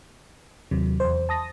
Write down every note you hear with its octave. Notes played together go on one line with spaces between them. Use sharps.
D#2 C3 F#3
E2 C5
A5 D#6 A#6